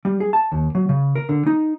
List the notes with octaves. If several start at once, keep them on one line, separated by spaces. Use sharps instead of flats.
G3
G#4
A5
D#2
F#3
C#3
A#4
D3
D#4